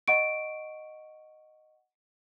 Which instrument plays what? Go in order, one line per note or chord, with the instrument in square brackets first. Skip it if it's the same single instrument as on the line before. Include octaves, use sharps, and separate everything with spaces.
[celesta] D#5 F#5 C#6 D7